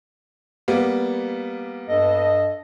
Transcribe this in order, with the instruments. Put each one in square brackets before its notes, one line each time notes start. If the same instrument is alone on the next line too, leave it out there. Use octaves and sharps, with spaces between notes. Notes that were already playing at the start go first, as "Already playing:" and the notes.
[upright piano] G3 A#3 B3
[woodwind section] G2 A4 D#5